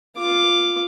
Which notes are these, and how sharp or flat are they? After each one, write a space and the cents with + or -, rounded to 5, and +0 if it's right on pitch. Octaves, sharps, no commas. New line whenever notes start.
F4 +0 D6 +0